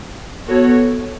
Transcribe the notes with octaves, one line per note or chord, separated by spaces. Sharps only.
B3 F#4 A4 C#5